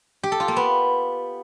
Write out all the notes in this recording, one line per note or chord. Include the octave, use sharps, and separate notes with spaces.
G4
A4
F4
A#3
B3